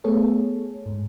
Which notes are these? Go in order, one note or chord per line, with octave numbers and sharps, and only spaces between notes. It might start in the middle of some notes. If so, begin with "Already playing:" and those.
A3 B3 G#4 A4 C#5
G#2